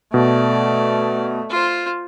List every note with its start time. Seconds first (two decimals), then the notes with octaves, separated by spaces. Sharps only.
0.14 B2 A3 D5
1.50 F4 C5